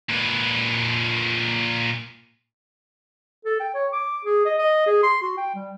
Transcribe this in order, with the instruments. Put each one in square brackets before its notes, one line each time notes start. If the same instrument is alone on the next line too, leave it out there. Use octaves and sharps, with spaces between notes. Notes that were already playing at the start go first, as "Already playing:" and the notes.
[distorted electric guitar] A#2 B4
[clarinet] A4
G5
C#5
D6
G#4
D#5
D#5
G#4
C6
F#4
G5
G3